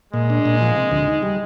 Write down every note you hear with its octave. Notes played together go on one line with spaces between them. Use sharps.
A#2 G#3
D4
A#2
F3
C3
D2
D#4
G3